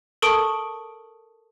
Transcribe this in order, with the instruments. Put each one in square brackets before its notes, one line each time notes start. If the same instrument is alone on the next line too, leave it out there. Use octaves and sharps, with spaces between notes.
[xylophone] A4 A#4 A5 C#6 D#6 D7